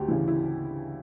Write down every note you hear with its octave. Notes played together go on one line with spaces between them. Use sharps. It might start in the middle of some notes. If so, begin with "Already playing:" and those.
Already playing: D2 F#4 G4
C#3 E3 E4
E4